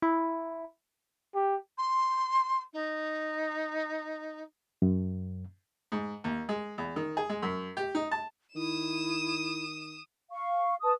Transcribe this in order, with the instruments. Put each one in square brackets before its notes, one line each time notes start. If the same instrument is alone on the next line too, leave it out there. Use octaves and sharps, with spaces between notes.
[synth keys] E4
[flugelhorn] G4
[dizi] C6
D#4
[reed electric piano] F#2
[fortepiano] G#2
D#2
G#3
E2
D#3
G#4
G#3
F#2
G4
D#4
A5
[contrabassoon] D#3 [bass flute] E4 [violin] D#6 E7
[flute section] F5 C#6
B4 A5 D#6